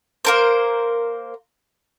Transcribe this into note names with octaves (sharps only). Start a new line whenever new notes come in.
A#3 A#4 C5